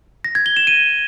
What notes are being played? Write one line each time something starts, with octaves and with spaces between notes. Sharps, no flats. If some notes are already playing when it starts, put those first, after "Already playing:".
A#6
G#6
G7
E7
D#7